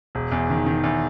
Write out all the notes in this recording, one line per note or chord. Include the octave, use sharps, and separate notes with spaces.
E1
E2
D#3
D#3
E2